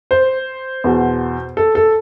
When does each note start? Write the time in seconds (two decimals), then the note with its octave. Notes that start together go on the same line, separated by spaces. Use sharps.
0.11 C5
0.84 E2 B2
1.57 A4
1.75 A4